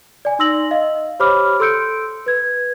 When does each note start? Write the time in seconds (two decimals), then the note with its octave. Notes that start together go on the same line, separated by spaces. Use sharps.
0.25 D5 G#5
0.39 D#4 C6 E6 A#6 F#7
0.71 D#5 F5
1.20 G4 C5 C#5 B5 D6 F6
1.60 A4 C6 E6 G6 C#7 D7
2.26 B4 G#6